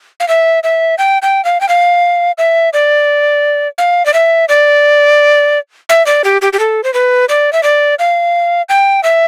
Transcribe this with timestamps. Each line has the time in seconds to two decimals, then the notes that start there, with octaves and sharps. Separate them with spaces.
0.20 F5
0.28 E5
0.64 E5
0.98 G5
1.22 G5
1.45 F5
1.61 G5
1.69 F5
2.38 E5
2.73 D5
3.78 F5
4.06 D5
4.14 E5
4.49 D5
5.89 E5
6.06 D5
6.24 G4
6.42 G4
6.53 G4
6.59 A4
6.84 C5
6.94 B4
7.29 D5
7.53 E5
7.63 D5
7.99 F5
8.69 G5
9.04 E5